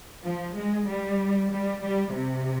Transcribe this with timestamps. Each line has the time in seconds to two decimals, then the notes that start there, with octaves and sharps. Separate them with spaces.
0.24 F3
0.56 G#3
0.89 G3
1.52 G3
1.83 G3
2.15 C3